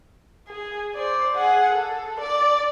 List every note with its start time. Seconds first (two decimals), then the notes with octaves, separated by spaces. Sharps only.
0.48 G#4
0.95 C5 D5
1.37 G#4 F#5
1.73 A4
2.20 D5 D6